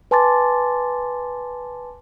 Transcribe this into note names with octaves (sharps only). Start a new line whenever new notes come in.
B4 G#5 A5 C6 D6 A6